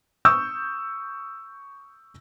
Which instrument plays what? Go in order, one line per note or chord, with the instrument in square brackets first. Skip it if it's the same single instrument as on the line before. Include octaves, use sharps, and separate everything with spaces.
[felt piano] C#6 D#6 E6 G6